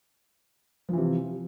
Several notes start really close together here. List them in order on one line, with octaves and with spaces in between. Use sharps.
F3 E3 C3